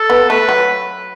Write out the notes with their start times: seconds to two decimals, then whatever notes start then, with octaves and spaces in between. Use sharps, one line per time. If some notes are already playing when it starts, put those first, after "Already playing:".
Already playing: A4
0.10 B3
0.29 A3 B4
0.49 F#3